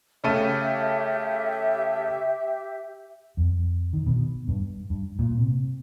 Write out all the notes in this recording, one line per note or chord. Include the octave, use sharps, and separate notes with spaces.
C#3 A3 G4 E5 D#7
F2
D#3
B2
G2
G2
A#2
C3